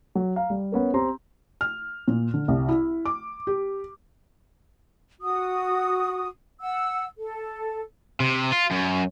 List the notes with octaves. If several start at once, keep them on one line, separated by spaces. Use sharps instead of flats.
F#3
F5 A#5
G3
B3 C#4 A#4
C4 G4 A#5 C6
F6
A#2
D3
C2
E4
D6
G4
F#4 D#6
F#5 E6
A4
C3
F4
F#2